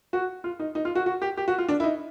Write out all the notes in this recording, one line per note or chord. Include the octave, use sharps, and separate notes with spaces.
F#4
F4
D#4
D#4
F4
F#4
F#4
G4
G4
F#4
F4
D4
E4
D#4